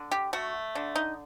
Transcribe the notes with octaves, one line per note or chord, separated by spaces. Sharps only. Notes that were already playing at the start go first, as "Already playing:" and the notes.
Already playing: D3
G4
A3 F#4
D3
D#4